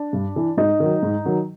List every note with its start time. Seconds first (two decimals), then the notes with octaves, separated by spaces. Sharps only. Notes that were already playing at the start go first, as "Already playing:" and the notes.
Already playing: D4
0.13 G2
0.36 E3
0.57 G#2 D#4
0.80 D#3 F#3
1.03 G#2
1.25 D#3 F#3